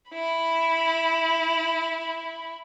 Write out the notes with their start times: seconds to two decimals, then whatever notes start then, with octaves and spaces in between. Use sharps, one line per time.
0.11 E4 B5